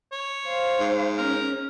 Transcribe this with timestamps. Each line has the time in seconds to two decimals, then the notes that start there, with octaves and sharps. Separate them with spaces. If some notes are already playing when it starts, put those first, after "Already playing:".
0.12 C#5
0.46 C5 F5
0.80 G#2
1.18 C#4 A#4